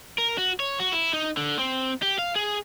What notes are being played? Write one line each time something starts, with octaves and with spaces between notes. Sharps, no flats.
A#4
F#4
C#5
F#4
E4
D#4
D3
C4
G4
F5
G#4